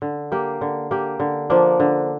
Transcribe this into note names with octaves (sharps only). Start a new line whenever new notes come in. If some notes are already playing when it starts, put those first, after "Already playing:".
D3
A#3 G4
D3
A#3 G4
D3
F3 A#3 D4
D3